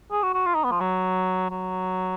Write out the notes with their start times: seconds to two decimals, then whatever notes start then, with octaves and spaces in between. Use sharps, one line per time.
0.11 G#4
0.23 F#4
0.34 F#4
0.46 F4
0.55 D#4
0.64 B3
0.72 F3
0.80 F#3
1.50 F#3